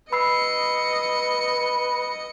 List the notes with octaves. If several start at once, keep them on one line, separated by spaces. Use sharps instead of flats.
B4 D#5 B5 E6 C7 C#7